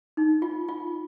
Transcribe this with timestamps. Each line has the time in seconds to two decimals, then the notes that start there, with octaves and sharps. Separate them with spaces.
0.17 D#4
0.42 F4
0.68 F4